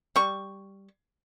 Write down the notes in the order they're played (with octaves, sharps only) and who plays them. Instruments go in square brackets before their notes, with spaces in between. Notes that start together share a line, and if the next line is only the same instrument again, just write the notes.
[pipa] G3 C#6